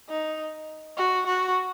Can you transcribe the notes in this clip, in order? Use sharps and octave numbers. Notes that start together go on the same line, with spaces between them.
D#4
F#4
F#4